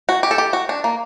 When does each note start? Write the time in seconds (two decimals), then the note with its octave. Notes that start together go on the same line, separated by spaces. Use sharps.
0.09 F#4
0.23 G4
0.31 A4
0.38 G4
0.53 F#4
0.69 D4
0.84 A#3